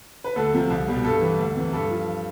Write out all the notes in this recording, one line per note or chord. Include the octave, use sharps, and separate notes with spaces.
B4
D2 A4
C3 F3
C2
B2 G3
G2 A4
E3 G3
D2
C3 E3
G2 A4
F3